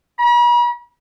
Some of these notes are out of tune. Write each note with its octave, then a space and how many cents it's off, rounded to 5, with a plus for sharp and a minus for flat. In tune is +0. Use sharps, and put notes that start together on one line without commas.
B5 -45